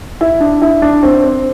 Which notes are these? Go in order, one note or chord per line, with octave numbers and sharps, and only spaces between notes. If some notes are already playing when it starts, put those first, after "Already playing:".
E4
D4
E4
D4
C4
C4